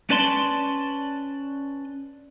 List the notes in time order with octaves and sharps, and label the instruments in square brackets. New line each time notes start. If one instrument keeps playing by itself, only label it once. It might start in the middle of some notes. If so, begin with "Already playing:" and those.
[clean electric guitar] C#4 B4 D5 A5 C6